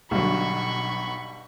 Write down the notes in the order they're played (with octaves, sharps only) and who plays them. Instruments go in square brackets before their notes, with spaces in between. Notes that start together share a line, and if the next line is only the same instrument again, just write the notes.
[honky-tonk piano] B1 F#3 [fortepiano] G2 D3 [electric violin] B5 C#6